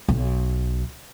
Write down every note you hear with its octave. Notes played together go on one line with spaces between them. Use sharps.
B1